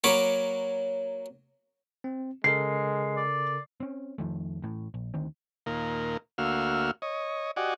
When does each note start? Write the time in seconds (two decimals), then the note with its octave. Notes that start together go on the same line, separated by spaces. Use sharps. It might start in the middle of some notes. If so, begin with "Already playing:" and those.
0.04 F#3 A#3 C#5 B5 D6
2.04 C4
2.44 C#3 G#3 A4 A#4 C7
3.17 D5
3.80 C4 C#4
4.18 F2 D#3 F3 A3
4.62 A1 A2
4.94 A#1
5.14 D2 D#3 C4
5.66 D#2 A#2 A#4
6.38 D2 A#3 F#4 F5 E6 F6
7.02 C#5 D#5
7.56 F#4 G4 D5 D#5 F#5 G#5